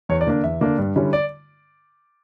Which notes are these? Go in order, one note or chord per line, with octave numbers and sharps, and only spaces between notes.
E2 C#5
D5
D3 A#3 D4
E2 E5
D3 A#3 D4
G2
D3 G3 C#4 E4
D5